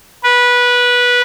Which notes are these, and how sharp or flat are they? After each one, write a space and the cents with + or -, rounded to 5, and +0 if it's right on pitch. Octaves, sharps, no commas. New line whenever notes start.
B4 -15